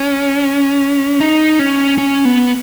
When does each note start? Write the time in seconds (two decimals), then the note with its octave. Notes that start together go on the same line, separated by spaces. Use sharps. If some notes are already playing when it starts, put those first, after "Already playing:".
Already playing: C#4
1.20 D#4
1.59 C#4
1.98 C#4
2.25 B3